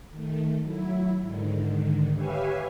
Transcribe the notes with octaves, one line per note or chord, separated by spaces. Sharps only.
D#3 A3
F#3 E4
G#2 D3 D#3
G4 B4 C#5 E5 F5 G#5